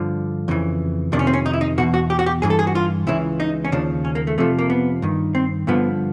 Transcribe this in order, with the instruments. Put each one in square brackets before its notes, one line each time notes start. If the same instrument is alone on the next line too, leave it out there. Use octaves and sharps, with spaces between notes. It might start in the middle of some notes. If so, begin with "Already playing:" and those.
Already playing: [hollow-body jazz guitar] G2 D3 F3
F2 C#3 E3
F2 C3 D#3 D4
C#4
C4
C#4
D#4
E4
D#4
E2 B2 F#4
F#4
G4
F#4
G4
G2 E3 G#4
A4
G#4
F#4
F4
C#2 C#3 E3 E4
D#4
C#4
D#2 C#3 F3 D4
C#4
A#3
A3
F2 C3 F3 A3
A#3
B3
G2 D#3
C4
G2 D3 F3 B3